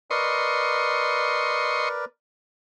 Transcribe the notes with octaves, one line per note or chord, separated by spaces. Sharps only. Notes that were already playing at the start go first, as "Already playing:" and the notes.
A#4 B4 D5 D#5 C6 C#6